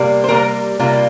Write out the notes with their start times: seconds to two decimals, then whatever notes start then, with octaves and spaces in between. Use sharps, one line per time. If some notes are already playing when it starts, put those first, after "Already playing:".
Already playing: C3 G3 A#3
0.24 C5
0.28 C3 G3 A#3 A#4
0.79 C3 G3 A#3 F4